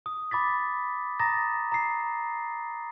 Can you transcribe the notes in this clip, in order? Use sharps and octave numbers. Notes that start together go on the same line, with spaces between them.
D#6
B5 D6 A6 B6
A#5 D#6 A6 A#6
A#5 C7